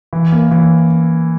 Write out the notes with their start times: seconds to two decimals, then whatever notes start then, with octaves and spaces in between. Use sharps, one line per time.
0.13 E3
0.32 A#3
0.51 E3